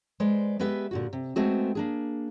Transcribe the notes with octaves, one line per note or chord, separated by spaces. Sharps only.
G#3 B4 C5 D5
G#3 B3 G4 B4 E5
A#2 D3 F#4
C3
G#3 A3 B3 C4 F#4 G#4
A#3 D4 G#4